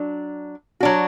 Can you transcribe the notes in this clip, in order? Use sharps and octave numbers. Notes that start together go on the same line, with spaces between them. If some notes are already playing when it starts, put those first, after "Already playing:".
Already playing: F#3 D4
F#3 D4 F#4